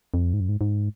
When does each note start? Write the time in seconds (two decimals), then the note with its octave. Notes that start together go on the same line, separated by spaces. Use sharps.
0.14 F2
0.33 G#2
0.40 F#2
0.49 G#2
0.61 G#2